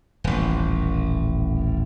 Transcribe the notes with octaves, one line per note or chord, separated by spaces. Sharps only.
D#1 A1